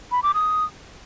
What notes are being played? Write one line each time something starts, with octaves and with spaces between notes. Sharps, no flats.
B5
D6
D#6